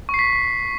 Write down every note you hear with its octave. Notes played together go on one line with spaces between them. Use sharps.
C#6
C7
B6